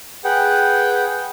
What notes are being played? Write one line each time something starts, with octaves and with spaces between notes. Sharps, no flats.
G#4 B4 F#5 G5